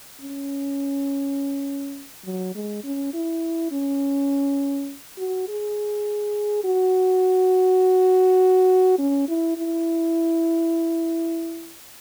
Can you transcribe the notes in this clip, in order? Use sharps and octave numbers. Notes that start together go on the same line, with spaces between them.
C#4
F#3
G#3
C#4
E4
C#4
F#4
G#4
F#4
C#4
E4
E4